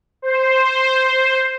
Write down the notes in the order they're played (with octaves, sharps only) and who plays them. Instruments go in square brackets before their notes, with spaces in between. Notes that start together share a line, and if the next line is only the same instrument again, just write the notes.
[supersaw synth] C5